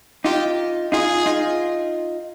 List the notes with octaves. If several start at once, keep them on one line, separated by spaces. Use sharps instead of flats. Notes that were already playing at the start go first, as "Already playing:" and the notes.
D#4 F4 G4
D#4 F4 G#4
D#4 F4